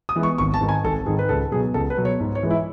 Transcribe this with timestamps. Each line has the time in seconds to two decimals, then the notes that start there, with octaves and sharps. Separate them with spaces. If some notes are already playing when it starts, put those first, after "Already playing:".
0.09 D#6
0.16 E3 G#3 B3
0.23 C#6
0.38 G#1 C#6
0.54 A5
0.61 G#2 D#3
0.69 G#5
0.84 G#1 A4
1.06 G#2 D#3 G#4
1.19 B4
1.29 C#2 A4
1.51 B2 F#3 G#4
1.74 C#2 A4
1.90 B4
1.97 B2 F#3
2.05 C#5
2.20 G#2
2.35 C#5
2.43 E3 G#3
2.50 E4